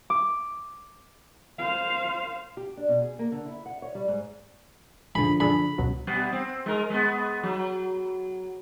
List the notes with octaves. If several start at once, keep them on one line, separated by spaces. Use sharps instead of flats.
D6
C5 F5
G4
D4
B2
G#4
A#3
D3
E4
F#5
C#5
G3
G#2
D3 F3 G#4 B5
D4 G#4 A4 B5
C#2 B2 F#3
B2 G3 B3
C4
G#3 A#4
G#3 B3
F#3